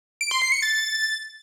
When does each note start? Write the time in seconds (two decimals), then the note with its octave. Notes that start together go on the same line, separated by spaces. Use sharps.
0.21 D7
0.31 C6
0.42 C7
0.52 C#7
0.62 A6